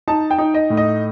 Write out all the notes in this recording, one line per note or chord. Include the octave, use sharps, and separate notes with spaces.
D#4 A5
G5
D#4
D#5
A2
D#5